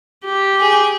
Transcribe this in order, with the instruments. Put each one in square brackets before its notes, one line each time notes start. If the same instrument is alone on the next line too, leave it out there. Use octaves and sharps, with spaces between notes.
[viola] G4
[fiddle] G#4